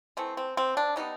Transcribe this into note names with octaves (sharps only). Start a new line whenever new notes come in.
E3 A3 C4
C4
C4
D4
E3 G3 B3 D#4